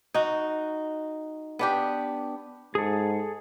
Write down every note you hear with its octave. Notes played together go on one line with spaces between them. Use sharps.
D#4 F#4
B3 D4 G4
G#2 G#4 A4